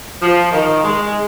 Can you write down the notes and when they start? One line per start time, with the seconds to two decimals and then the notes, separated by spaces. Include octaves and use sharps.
0.20 F3
0.51 D#3
0.83 G#3